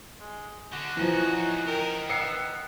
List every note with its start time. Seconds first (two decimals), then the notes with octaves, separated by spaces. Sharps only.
0.20 G#3
0.73 D3 F#4
0.97 E3 F3 C#4 D#4
1.67 A#4 D#5 G5
2.10 B3 E6 C7 C#7